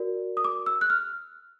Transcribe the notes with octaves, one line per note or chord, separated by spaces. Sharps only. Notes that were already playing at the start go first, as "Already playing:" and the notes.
Already playing: F#4 A#4 D5
D#6
D6
E6
F#6
F6